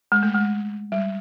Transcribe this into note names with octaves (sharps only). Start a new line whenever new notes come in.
G#3
A3
G#3
G3